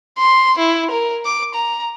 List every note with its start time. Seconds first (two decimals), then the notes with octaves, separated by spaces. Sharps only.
0.19 C6
0.58 E4
0.91 A#4
1.25 D6
1.55 A#5